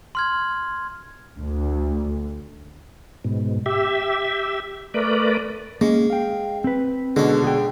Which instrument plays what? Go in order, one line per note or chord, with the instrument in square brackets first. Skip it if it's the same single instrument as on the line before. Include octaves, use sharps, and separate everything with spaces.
[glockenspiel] C6 F6 G#6
[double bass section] D2
[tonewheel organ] G#2 B2
G4 E5
A3 A#4 B4 D5
[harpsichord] G#3 [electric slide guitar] A#3 C#4
[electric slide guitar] F5 G5
C4 B4
[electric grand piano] B2 D3 [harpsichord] G#3 C#4
[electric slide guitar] G#4 G5